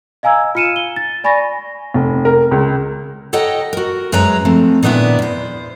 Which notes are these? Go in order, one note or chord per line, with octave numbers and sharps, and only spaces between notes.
D#5 F5 G#5 A#5 E6 G#6
F4 F6 C#7 D#7 E7
G7
A6
D5 G#5 B5 C#6 A6 A#6
F1
A#4
C#2
A4 C#5 D#5 F#5 G5 A#5
F#4 A#4
F#2 G#3 B4 C#5 A#5
F3 A3 C4
A#2 D#3 B3 D4 E4
E2 C5